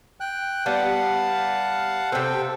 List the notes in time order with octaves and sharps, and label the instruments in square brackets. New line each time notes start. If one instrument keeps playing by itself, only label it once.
[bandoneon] G5 F#6
[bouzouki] G3 B3 [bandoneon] F5 F#5 A5
[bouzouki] C3 C4 [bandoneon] A4 G5